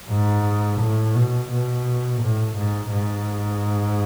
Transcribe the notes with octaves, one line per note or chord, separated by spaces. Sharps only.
G#2
A2
B2
B2
A2
G#2
G#2